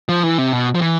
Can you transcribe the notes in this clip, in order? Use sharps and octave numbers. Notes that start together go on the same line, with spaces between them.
F3
E3
C3
B2
F3
E3